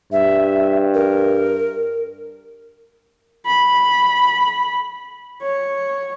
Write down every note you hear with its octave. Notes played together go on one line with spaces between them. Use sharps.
G2 E5
A#4
B5
C#5